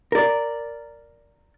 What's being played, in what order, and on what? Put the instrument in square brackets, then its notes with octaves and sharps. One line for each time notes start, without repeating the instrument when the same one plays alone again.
[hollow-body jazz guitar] A#4 D5